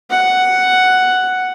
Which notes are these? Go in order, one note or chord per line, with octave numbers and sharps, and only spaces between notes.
F#5